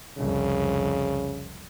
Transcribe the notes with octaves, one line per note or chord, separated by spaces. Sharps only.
C2 F2 C#3